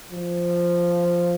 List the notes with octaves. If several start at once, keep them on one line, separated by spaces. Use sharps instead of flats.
F3